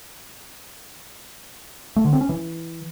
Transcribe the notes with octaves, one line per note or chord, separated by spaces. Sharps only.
A3
D3
C4
C#4
E3